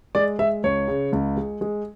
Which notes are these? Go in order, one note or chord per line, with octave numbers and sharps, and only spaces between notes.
G#3 D5
G#3 E5
C#2 C#5
C#3
C#2
G#3
G#3